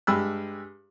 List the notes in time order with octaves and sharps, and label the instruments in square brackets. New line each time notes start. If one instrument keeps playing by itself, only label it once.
[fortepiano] G2 G#3 G4 B5 E6